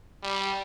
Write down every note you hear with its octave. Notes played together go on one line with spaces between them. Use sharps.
G3